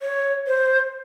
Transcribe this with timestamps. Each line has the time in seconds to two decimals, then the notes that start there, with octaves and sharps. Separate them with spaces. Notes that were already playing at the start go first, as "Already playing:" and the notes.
0.02 C#5
0.47 C5